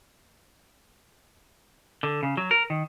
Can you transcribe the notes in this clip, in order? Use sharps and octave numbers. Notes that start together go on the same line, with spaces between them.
D3
C#3
F#3
A#4
D#3